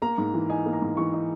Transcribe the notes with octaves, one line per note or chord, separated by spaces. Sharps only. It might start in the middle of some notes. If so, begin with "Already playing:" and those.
A#3 A#5
G#2
E3
D#4 G#5
A#3
A#5
G#2
E3 C#6
D#4